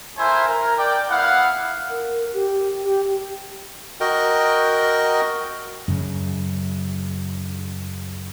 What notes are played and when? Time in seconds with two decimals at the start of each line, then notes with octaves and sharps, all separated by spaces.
0.18 A3 E4 A#4 C5 E5 G#5
0.48 A#4
0.77 D5 G5
1.09 B3 E4 F5 F#5
1.90 A#4
2.34 G4
2.84 G4
4.00 F#4 A#4 D#5 G5
5.88 F#2 C#3 F#3